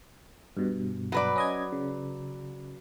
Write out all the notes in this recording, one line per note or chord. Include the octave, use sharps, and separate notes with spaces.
G2 B2
F#3 B4 D5
C#4 D#5 G#6
C#3